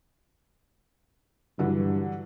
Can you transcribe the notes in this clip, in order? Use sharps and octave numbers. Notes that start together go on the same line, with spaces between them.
G2 D3 E3 F#3